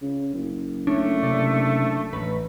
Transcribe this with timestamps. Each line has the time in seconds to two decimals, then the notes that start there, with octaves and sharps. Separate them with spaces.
0.02 C#3
0.33 F#1
0.87 A3 C#4 D4
1.23 C3 D4
2.13 A1 B4